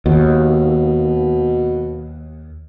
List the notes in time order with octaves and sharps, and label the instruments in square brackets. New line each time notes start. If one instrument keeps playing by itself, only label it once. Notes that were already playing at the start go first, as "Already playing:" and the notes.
[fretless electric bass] D#2 [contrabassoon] B2